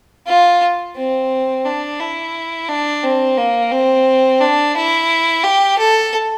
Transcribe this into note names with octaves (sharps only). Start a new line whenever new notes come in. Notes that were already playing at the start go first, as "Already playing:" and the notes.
F4
C4
D4
E4
D4
C4
A#3
C4
D4
E4
G4
A4